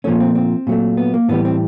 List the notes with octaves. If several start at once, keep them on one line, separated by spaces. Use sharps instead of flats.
A#2 F3 A3 C#4
C4
C4
A#2 F#3 A3
B3
A#3
A2 E3 G3 B3
C4